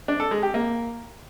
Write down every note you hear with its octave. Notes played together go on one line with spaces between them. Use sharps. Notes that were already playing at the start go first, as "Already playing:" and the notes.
D4
A4
G#3
G4
A#3